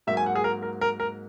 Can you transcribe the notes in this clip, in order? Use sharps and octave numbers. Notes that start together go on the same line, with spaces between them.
G#2 F#3 A#3 E5
G#5
F#5
G#4
A#4
A#4
A#4
A#4